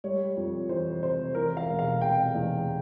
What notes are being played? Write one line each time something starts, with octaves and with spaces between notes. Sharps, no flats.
G3 C#5
F2
E3 C5
C3 C5
E3 A#4
F5
E1
F5
C3 G5
E2